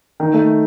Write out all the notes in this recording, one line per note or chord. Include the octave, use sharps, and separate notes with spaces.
D#3
A3